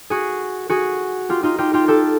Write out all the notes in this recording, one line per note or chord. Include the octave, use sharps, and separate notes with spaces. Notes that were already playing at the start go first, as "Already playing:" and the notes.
F#4 G#4
F#4 G#4
F4 G4
D#4 F4
F4 G4
F4 G4
G4 A4